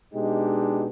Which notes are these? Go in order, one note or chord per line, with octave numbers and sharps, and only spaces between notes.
B2 G#3 D4 D#4 G4